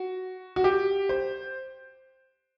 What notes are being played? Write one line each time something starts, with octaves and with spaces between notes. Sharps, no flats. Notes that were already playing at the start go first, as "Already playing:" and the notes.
Already playing: F#4
F#4
G4
C5